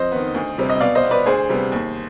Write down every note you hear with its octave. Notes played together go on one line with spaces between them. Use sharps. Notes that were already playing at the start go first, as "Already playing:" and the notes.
Already playing: F2 C5 D#5
D#3 B3
D2
C3 G3 C4
D#5
B2 D5 F5
C5 D#5
B3
B4 D5
D2 G#4 C5
C3 G3 B3
D#2